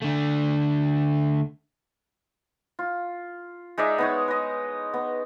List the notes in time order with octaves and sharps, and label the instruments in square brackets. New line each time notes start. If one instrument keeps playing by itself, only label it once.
[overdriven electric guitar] D3 A3
[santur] F4
G#3 D#4 D5 E5
B3 D#4 C#5
B4 D#5
B3